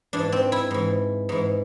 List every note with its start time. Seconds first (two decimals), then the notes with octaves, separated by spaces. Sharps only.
0.13 G#2 E3 D4
0.32 C4
0.52 E4
0.71 G#2 E3
1.29 G#2 E3